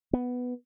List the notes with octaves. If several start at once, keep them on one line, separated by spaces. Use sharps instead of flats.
B3